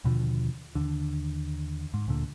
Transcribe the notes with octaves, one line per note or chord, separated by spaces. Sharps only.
D#2 B2 D3 F3
D#2 D3
G#2
D2 A#2 D3